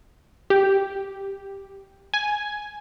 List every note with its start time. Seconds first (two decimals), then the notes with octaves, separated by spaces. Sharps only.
0.50 G4
2.14 G#5